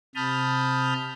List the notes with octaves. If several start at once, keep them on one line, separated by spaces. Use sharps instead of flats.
C3 A5 B5 D#6 F6 G6